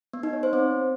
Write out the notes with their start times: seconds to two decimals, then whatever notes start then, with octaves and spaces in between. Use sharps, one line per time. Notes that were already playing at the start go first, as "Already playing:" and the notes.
0.13 B3
0.23 D#4
0.33 C#5
0.43 C5
0.53 C4